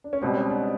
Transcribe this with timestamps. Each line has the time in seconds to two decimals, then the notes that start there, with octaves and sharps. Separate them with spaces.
0.04 D4
0.13 C#4
0.22 C#2 B2 G3 C4
0.36 C#4
0.50 D4